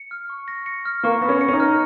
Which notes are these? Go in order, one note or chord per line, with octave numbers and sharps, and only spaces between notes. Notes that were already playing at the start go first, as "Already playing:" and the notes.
Already playing: C#7
F6
C#6
A#6
C#7
F6
A#3 C#6
B3 A#6
C#4
C#7
C#4
D#4
F6